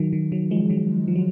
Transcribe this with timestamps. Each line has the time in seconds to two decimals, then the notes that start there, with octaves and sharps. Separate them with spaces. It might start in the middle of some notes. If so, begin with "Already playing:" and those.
Already playing: D#3 F#3
0.13 D#3
0.32 D#3 F#3
0.51 F3 G#3
0.70 D#3 F#3
1.08 F3
1.16 F#3